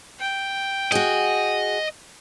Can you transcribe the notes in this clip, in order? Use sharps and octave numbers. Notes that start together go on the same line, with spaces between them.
G5
F#4 G#4 D#5